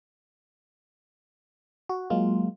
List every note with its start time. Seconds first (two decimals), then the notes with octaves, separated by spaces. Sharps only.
1.89 F#4
2.10 F#3 G#3 A#3 F4